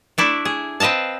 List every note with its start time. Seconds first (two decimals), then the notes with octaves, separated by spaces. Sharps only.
0.18 A3 D4 E4
0.45 G#4
0.80 C4 B4 D#5 F5 A5